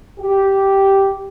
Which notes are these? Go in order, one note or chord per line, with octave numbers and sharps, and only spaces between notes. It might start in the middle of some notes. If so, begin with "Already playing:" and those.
G4